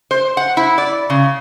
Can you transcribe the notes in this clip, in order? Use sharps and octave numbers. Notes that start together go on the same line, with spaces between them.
C5
F#5
E4
D5
C#3